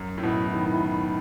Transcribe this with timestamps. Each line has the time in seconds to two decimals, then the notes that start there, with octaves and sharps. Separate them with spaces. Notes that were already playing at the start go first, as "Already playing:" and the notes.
Already playing: F#2
0.18 A2
0.23 B2 E4
0.53 D#3